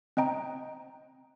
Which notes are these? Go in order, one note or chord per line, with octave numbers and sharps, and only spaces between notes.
C4 D#5 G5 A#5